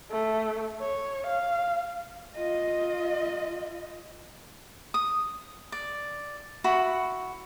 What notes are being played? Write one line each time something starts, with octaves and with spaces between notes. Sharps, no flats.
A3
C#5
F5
F4 D#5
D#6
D5
E4 F#4 B5